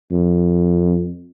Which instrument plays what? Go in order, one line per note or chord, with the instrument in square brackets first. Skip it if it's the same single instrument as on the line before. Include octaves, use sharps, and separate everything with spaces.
[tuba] F2